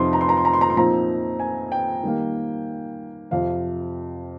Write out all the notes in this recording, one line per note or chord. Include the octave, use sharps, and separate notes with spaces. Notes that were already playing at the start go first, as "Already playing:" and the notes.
Already playing: F2 C3 F3 C4 D#4 C6
A#5
C6
A#5
C6
A#5
C6
A#5
C6
A#2 F3 C4 D#4 A#5
G#5
G5
D#3 G3 A#3
F2 C3 F3 F5